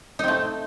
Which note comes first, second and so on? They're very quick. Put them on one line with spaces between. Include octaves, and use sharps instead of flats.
D#4 C4 A3